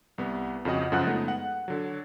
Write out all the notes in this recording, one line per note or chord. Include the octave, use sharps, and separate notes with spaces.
C2 B3
F2 C#3 F#4 D#5 F#5
F#2 C#3 F3 F#5 F#6
G#3 A3 B3 D#4
F#5
D3 F#3